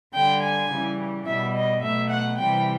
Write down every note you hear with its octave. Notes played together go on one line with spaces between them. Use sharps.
D3 G3 G5
G#5
C#3 E3 G3
B2 G3 E5
D#5
B2 F#3 A3 E5
F#5
C3 E3 G3 G5